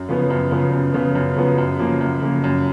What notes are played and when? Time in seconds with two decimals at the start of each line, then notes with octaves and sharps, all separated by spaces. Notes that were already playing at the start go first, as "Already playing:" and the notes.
Already playing: F#2
0.09 C#3 F3 B3
0.30 F#2
0.51 C#3 F3 B3
0.73 F#2
0.94 C#3 F3 B3
1.15 F#2
1.37 C#3 F3 B3
1.58 F#2
1.79 C#3 F3 A#3
2.00 F#2
2.22 C#3 F3 A#3
2.44 F#2